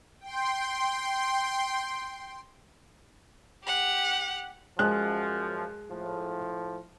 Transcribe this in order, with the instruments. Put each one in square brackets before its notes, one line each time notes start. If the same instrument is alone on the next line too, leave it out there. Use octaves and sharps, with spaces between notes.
[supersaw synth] G5 C6
[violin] G4 F#5
[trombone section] F#2 F3 [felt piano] G#3 F#6
[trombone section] A2 F3